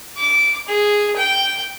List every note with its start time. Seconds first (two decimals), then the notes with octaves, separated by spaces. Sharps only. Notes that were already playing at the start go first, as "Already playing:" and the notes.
0.18 D6
0.68 G#4
1.17 G5